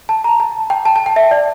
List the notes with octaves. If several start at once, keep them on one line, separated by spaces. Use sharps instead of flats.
A5
A#5
A5
G5
A5
A5
G5
E5
D5